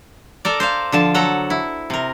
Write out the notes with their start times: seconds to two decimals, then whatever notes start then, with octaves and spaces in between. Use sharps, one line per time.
0.45 A4 A#4 D5
0.60 C5 D5 F5
0.92 D3 F3 A5
1.14 F#3 A4 F#5 A5 A#5
1.50 E4
1.90 C3 A#4